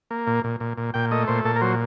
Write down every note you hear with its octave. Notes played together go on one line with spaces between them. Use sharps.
A#3
A#2
A#2
A#2
A#2
A#2 G5
A3 D#5
A#2 C5
A#2 A4
A#4
F#3 C5